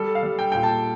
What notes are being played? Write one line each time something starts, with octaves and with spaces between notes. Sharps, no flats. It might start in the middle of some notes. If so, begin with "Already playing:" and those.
Already playing: G3 A4
F5
G3
G5
A#2 G5
A5